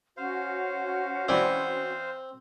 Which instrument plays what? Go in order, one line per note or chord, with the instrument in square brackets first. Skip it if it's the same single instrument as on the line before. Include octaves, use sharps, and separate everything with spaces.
[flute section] C#4 F#4 [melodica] C5 F5
[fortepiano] E3 D5 E5 [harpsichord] C4